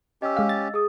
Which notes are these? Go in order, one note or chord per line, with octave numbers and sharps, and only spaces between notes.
C#4 G4 D#5 E6
G#3 F5
A6
G#4 D#6